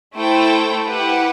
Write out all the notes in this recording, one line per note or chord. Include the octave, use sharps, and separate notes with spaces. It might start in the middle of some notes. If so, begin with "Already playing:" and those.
A3 E4 A4 C5 G5
E4 G4 B4 F#5